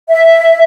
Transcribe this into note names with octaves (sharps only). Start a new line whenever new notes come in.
E5